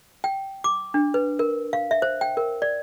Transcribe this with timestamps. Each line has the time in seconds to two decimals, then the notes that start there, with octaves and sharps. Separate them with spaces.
0.24 G5
0.64 D6
0.94 D4
1.14 B4
1.39 A#4
1.73 F5
1.91 E5
2.02 C5
2.21 G5
2.37 A#4
2.62 D5